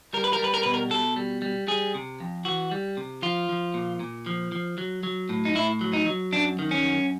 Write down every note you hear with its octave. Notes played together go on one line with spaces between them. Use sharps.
G3 A#4
B4
A#4
G3 B4
A#4
B2 B4
A#4
B2 A4
G3
G3
G3 G#4
C3
F2
E3 F#4
G3
C3
F3 F4
F3
A#2
A#2
F3
F3
F#3
F#3
A2
D#4
A2 E4
F#3
D#4
F#3
F#2 D4
D#3
C#4
F#2